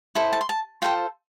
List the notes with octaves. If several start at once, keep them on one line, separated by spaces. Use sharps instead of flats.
E4 A4 C5
A5
C6
A5
F4 A4 C5 G5